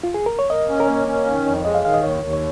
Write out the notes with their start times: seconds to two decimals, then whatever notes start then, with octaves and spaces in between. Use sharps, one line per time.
0.04 F4
0.14 G#4
0.26 A#4
0.39 C#5
0.50 A#3 D#5
0.69 C#4
0.80 A#4
0.88 A#3 C#5
1.08 C#4
1.26 D#3
1.46 F2
1.65 G#3 D#5
1.74 F5
1.85 D#3 F5
1.94 D#5
2.03 D#2 C#5
2.23 D#2 A#4
2.33 C#5